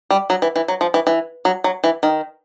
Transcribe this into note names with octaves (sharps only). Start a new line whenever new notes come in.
G3
F#3
E3
E3
F#3
F3
E3
E3
F#3
F#3
E3
D#3